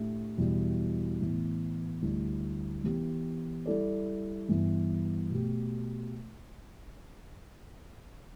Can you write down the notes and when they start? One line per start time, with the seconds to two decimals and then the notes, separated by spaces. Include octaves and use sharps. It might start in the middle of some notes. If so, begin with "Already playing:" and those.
Already playing: A2 A3 D4 G4 E5
0.37 E2 B2 G3 E4
1.20 A2 E3 B3
2.02 D2 D3 G3 E4
2.84 E3 B3 G4
3.66 G3 E4 A4 D5
4.48 G2 E3 B3
5.30 B2 A3 G4